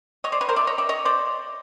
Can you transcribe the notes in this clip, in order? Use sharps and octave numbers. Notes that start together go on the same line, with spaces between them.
C#5 D#5
C5 D5
B4 C#5
A#4 C5
D5 E5
C#5 D#5
D5 E5
C#5 D#5
C5 D5